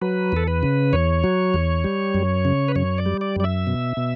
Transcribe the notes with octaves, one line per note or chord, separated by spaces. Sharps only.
F#3 B4
E2 A4
B4
C#3
E2 C#5
F#3
E2
G3
F#2
C#3
B4
F#2 C#5
D5
G3
D5
F#2 D5
E5
B2
B2